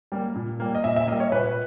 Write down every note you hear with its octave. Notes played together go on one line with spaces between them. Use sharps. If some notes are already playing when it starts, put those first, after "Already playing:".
G3 A#3
A#2
G3 A#3
D#5
A#2 E5
E5
G3 A#3 D#5
C#5
A#2 B4